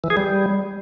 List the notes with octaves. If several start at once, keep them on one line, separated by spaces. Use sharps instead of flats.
E3
G#4
G3